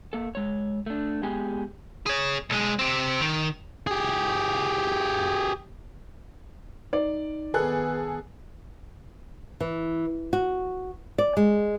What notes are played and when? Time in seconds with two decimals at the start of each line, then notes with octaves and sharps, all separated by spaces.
0.13 A#3 A4
0.35 G#3 C#5
0.86 A3 D4
1.23 G#3 B3 G4 G#4 G#5
2.06 G#4 C#5
2.50 B1 G#3
2.79 C4 G4
3.21 D#3
3.87 G4 G#4
6.93 D#4 D5
7.54 D#3 B3 G#4 A4 B4 F#6
9.60 E3
10.33 F#4
11.18 D5
11.37 G#3